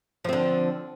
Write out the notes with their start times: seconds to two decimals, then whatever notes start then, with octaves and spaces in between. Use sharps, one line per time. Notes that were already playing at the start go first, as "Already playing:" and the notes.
0.25 F3
0.29 C4
0.33 D3